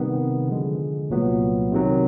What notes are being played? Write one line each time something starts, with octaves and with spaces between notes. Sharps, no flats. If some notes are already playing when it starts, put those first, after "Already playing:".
Already playing: C3 D#3 G3 B3
D3 F3 G#3
C2 A#2 F#3 B3
C3 D#3 F#3